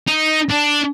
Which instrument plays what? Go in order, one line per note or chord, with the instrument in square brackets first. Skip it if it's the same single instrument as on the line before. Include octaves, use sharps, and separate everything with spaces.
[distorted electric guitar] D#4
D4